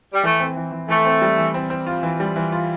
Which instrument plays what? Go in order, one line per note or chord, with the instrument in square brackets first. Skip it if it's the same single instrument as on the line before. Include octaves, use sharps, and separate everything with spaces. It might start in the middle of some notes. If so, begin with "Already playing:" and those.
[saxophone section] G3
[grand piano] E3 [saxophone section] A3
[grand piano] C4
E3
E3
[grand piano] E3 [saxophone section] A3
[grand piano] C4
G3
E3
C4
C4
F4
E3
G3
E3
F4